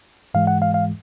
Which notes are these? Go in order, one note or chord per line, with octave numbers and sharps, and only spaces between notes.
G#2 E3 G#3 F5
F#5
F5
F5